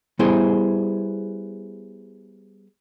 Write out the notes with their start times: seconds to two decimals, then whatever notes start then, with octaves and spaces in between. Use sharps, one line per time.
0.19 G3 B3 E4 G#4 C5